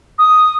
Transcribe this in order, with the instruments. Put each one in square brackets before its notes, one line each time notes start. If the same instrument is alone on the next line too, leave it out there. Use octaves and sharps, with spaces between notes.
[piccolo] D#6